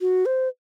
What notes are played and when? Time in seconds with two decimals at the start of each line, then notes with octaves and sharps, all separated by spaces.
0.01 F#4
0.26 C5